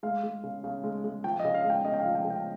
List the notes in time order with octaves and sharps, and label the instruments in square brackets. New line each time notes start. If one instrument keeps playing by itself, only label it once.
[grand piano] G#3 F5
G#3
C#3
C#3
G#3
G#3
F3 G5
D#5
C#3
F5
G#3
G5
C#3 D#5
G5
F5
F3
G5
C#3
G5